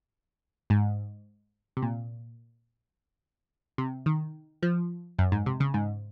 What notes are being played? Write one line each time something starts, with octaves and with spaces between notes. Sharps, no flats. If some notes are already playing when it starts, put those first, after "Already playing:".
G#2
C3
A#2
C3
D#3
F3
F#2
G#2
C3
C#3
G#2